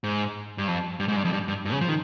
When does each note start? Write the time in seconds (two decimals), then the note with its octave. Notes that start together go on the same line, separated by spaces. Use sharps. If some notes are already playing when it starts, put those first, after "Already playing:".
0.04 G#2
0.58 G2
0.68 F2
1.00 G2
1.08 G#2
1.16 G2
1.25 F2
1.33 G2
1.48 G2
1.65 G2
1.73 C#3
1.81 F3
1.89 D#3